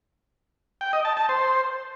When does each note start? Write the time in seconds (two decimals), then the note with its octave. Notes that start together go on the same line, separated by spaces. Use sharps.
0.81 G5
0.93 D#5
1.05 A5
1.17 A5
1.29 C5